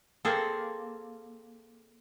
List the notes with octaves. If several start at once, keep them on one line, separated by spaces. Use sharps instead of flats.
A#3 C4 G#4 A4